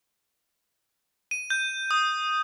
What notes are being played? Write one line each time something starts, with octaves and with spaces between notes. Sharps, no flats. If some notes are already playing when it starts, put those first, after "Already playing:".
D#7
G6
D#6